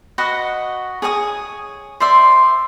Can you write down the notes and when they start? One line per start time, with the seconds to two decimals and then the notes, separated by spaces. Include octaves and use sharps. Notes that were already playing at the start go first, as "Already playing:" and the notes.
0.18 F#4 B4 D#5 F#5
1.02 G#4 C#5 G#5 D#6
2.00 C5 D5 E5 C6